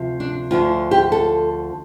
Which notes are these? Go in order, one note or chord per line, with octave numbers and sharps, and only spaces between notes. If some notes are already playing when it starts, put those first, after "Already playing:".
Already playing: D2 C3 F3
D4
D2 D3 F3 F4
G4
A4